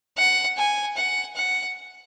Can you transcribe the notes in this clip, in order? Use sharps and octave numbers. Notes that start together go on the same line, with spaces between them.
F#5
G#5
F#5
F#5